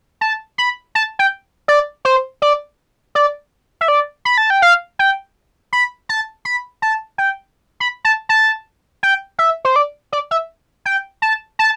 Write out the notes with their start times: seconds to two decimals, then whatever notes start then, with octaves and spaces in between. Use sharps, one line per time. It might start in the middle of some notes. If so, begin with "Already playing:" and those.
0.21 A5
0.58 B5
0.95 A5
1.19 G5
1.68 D5
2.05 C5
2.42 D5
3.15 D5
3.81 E5
3.88 D5
4.25 B5
4.38 A5
4.50 G5
4.62 F5
4.99 G5
5.73 B5
6.09 A5
6.45 B5
6.82 A5
7.18 G5
7.80 B5
8.05 A5
8.29 A5
9.03 G5
9.39 E5
9.65 C5
9.76 D5
10.13 D5
10.31 E5
10.85 G5
11.22 A5
11.59 A5